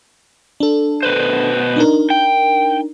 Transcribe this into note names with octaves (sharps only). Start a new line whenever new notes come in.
D4 A4
B2 B4 C5
D4 D#4 A#4
G5